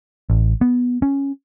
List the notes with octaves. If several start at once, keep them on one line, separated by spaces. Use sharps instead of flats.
A1
B3
C#4